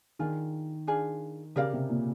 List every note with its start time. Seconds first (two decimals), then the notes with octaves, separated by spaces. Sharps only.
0.19 D#3 D4 F4 G#4
0.87 D4 F4 G#4
1.56 C#3 G4 A#4 D5 F5
1.73 C3
1.89 A#2